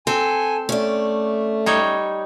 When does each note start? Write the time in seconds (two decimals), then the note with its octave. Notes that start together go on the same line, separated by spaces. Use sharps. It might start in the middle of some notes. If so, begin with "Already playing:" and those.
0.07 C4 A4 G#5
0.69 A3 C#4 D5
1.66 G3 D#4 C#5